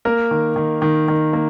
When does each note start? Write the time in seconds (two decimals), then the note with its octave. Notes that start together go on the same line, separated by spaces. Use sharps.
0.05 A#3 A#4
0.31 D#3
0.56 D#3
0.82 D#3
1.08 D#3
1.33 A#3